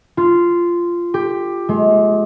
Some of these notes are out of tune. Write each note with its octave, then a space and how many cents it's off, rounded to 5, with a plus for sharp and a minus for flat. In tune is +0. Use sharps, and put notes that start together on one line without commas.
F4 -10
G4 +10
G#3 +35